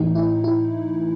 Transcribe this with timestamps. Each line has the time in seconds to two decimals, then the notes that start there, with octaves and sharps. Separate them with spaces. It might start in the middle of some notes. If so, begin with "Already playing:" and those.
Already playing: A2 E3 A3 D#4
0.15 E4
0.44 E4